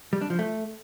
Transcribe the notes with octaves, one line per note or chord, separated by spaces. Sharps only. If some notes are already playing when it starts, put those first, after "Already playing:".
G3
D4
F3
A3